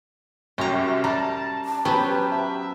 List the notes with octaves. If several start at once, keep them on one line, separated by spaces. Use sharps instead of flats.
C2 F#2 C#4 G4 A#5 C#6
G3 A5 A#5
A5
F#3 B3 C#4 G4 B4 C5
E5